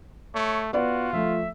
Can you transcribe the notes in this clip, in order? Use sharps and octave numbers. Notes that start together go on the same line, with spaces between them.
A3 C#5
B3 F4 F#4 D5
F3 A3 E5